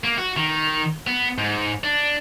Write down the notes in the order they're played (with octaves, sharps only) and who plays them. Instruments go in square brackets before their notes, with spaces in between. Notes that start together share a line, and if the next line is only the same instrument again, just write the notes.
[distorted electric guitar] A#3
F#4
D#3
B3
G#2
D4